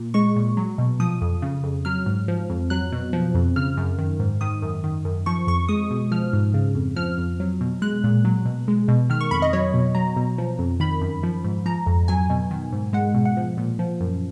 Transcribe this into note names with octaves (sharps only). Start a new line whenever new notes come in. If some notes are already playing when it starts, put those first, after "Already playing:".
Already playing: A#2
G#3 C#6
A#2
F#3
B2
F3 D#6
F2
C#3
F2
F#3 F6
G#2
F3
F2
F#3 F#6
B2
F3
F2
C#3 F6
F#2
D#3
G#2
D#3 D#6
F#2
D#3
F#2
F3 C#6
F2 C#6
G#3 D#6
B2
F3 F6
G#2
C#3
F2
F3 F6
F2
F#3
B2
G#3 F#6
A#2
F#3
B2
G#3
B2
D#3 F6
C#6
F2 B5
D#5
F#3 C#5
B2
F#3 A#5
B2
F3
F2
D#3 B5
F#2
F3
G#2
F3 A#5
F2
F#3 G#5
B2
D#3
G#2
G#3 F#5
B2
F#5
F3
A#2
F3
F#2